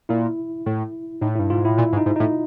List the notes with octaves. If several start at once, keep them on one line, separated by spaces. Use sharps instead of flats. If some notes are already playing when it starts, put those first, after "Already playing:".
A#2 E4
A2
A2 D#4
E4
G2
G#2 F4
A2 E4
A#2 E4
G#2
D#4
G#2
D#4
A2